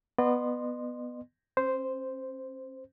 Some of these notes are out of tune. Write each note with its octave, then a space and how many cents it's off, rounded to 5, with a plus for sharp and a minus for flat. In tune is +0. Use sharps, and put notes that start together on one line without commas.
B3 +0 D#5 -40 C6 +0
C#4 -45 C5 -5